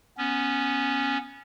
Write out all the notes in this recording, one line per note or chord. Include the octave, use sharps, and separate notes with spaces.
B3 C#4